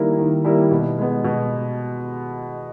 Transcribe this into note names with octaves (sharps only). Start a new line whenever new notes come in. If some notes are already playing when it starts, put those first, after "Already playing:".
Already playing: D#3 G3 A#3 E4 A#4
D#3
G3 A#3 E4 A#4
B2
G#3 B3
B2